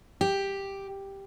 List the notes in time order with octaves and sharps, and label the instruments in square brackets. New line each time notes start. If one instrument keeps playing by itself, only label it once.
[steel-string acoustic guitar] G4